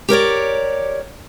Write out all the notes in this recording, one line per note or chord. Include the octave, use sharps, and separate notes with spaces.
G4 A#4 C#5 D5